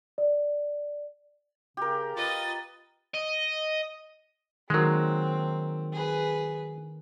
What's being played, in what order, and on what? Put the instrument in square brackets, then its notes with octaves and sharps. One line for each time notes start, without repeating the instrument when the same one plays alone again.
[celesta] D5
[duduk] C#3 [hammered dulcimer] G4 A#4
[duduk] F4 [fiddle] B4 D#5 [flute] A6
[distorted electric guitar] D#5
[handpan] D#3 A#4 [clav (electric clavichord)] F#3 G#3 [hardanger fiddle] C4
[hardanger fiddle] G#4 B4